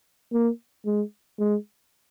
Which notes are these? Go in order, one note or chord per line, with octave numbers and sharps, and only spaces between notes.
A#3
G#3
G#3